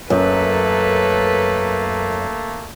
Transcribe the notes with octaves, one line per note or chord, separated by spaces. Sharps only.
F#2 A3 A#3 A4 B4